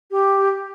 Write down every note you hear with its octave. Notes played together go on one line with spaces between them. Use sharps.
G4